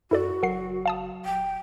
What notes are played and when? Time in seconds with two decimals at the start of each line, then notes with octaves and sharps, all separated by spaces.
0.11 F#2 E4 F#4 A4 D5
0.43 F#1 F#3 A#4 F#5 C7
0.86 F5 A5 D#6
1.25 D#1 G5